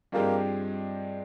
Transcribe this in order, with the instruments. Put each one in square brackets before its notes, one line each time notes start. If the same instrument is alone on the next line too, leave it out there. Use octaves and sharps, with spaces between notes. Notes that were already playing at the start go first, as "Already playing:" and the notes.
[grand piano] G2 F3 G#3 C4 G4 [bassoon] A#3